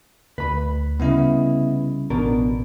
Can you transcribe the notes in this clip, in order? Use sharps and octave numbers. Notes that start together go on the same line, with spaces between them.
D2 B4 B5
C2 C#3 B3 E4 D#5
A1 B2 D4 A#4